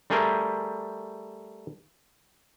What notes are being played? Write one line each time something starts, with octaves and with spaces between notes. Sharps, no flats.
G3 A3 G#4 A#4 C5